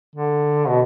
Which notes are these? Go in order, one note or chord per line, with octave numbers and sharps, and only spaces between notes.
D3
B2